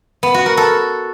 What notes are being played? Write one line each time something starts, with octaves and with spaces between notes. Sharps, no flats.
B3
F#4
A#4
A4